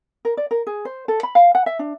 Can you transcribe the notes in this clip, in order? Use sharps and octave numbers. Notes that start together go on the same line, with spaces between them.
A#4
D5
A#4
G#4
C5
A4
B5
F5
F#5
E5
D4